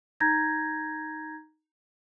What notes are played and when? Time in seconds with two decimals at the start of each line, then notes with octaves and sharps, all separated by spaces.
0.20 D#4 A#5 G6 G#6 A#6